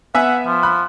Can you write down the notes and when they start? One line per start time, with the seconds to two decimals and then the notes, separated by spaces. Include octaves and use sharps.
0.15 B3 E5 F#5 G#5 E6
0.46 F3
0.63 B5 F#6